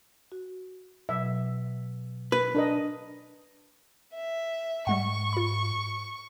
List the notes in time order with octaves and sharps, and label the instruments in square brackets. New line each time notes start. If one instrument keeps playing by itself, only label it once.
[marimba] F#4
[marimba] B2 F#3 [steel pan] E5
[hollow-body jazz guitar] B4
[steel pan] D4 A#4 D#5
[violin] E5
[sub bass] G#2 [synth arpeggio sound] G3 G#3 F#5 [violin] C#6
[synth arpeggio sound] F4 B5